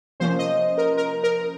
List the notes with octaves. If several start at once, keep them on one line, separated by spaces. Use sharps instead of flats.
C3 F3 A#3 C#4 C5
D#5
A#4
A#4
A#4